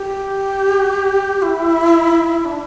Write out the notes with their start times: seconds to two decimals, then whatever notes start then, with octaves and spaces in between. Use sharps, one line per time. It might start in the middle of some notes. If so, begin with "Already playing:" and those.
Already playing: G4
1.42 E4
2.45 D4